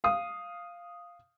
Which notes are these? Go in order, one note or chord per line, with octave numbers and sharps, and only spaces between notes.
F5 D#6